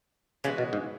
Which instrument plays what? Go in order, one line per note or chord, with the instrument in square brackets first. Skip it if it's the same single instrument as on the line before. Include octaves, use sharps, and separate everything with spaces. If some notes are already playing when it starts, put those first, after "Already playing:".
[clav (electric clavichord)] C#3 [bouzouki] E3 G#3 B3 F#4
[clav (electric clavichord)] B2
G#2